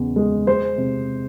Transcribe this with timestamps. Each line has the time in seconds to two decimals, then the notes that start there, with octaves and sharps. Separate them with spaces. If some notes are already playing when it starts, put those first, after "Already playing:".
Already playing: E2 C#3
0.16 G#3
0.47 G#3 C5
0.78 C3